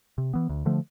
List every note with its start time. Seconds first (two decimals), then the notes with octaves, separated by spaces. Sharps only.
0.18 C3
0.34 E3 B3
0.49 D2
0.66 D3 F3 A3